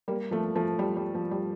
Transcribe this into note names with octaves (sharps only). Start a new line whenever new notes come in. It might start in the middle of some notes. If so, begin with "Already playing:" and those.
G3 A#3
F3 A3
F3 A3
G3
G3
F3
G3